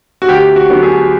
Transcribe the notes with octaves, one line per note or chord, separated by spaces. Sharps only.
F#4
D2 G4
F#4
D3 F#3 B3 D4
G#4